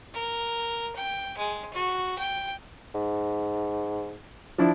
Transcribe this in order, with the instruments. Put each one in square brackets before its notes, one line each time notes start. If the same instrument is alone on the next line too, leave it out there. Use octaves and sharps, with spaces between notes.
[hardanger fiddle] A#4
G5
G#3
F#4
G5
[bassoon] G#2
[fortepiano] F3 D4 E4